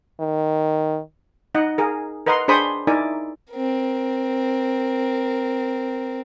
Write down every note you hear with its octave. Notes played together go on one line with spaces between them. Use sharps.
D#3
D#4 D#5 F#5
G#4 A#4
A#4 B4 D#5 F#5 A#5 C6
D4 G#4 C5 B5 C#6 D#6
D#4 E4 A#4 D5 E5 G#5
C4 A#4